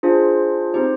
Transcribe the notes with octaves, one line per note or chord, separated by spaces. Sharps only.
D4 F4 G#4 C5
C4 D#4 G4 C5